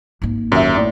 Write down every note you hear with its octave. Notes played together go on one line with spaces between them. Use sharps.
G#1 A#3
D#1 F#2 E5
A2 D5